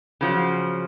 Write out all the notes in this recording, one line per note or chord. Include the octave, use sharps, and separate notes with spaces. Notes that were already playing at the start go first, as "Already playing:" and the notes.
C#3 F3 F#3